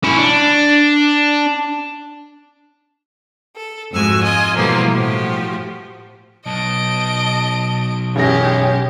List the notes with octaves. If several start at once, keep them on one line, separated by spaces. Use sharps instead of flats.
C#4 E4
D4
A4
F2 G#2 G#3 F#4 G#5 E6
F4 D#5 G#5
B2 E3 F3 G3 A3 A#3
A2 F3 F#4 G4
B1 D#5 A5 D7
A1 F#2 C#4 G4 G#4 A#6